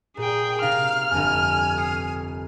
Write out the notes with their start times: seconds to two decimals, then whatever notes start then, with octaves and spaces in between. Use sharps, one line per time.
0.17 A#2 G#4 G5
0.62 C3 D#4 F5 F6
1.11 G1 F2 G#5
1.77 D#6 C7 C#7